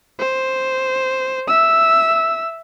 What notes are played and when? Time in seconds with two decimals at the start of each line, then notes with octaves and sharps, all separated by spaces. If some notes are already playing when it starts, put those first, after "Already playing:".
0.19 C5
1.48 E5 E6